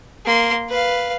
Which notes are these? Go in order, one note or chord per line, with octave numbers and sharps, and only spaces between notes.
A#3 C6
B4 F5